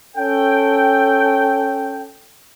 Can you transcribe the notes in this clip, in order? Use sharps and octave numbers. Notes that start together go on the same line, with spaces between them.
C#4 A4 G5